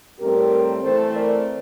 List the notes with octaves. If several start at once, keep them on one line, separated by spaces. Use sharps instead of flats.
A2 G3 C4 G4 A#4
E3 A3 C4 A4 C5
A#4 D5